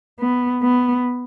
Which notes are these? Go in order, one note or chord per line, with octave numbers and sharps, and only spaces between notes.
B3
B3